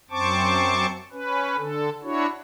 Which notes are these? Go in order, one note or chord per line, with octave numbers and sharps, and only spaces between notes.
F#2 C4 C5 A5 C#6 D6
C#4 B4
D3 A4
D4 E4 F#4 C#5